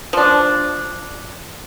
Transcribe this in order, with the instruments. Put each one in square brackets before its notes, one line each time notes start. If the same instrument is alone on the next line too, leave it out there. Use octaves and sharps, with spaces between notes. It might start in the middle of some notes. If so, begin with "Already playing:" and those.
[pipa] F3 D4